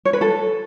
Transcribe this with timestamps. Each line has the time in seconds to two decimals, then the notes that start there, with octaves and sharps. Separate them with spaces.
0.05 C#5
0.13 B4
0.21 A4